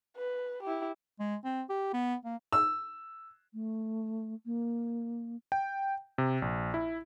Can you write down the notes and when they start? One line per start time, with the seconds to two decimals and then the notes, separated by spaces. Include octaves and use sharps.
0.17 B4
0.63 E4 G4
1.20 G#3
1.45 C4
1.69 G4
1.93 B3
2.25 A#3
2.53 E6
3.53 A3
4.46 A#3
5.52 G5
6.18 C3
6.42 A#1
6.74 E4